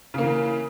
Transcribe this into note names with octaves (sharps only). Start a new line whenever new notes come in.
C#3 E3 A#3